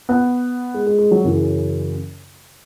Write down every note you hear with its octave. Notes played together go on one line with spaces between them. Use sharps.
B3
G#3
G#3
G#3
F#3
F#2 C#3 E3